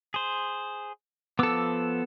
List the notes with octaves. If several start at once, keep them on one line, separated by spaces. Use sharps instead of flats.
G#4 C5
F3 B3 A4 D6 E6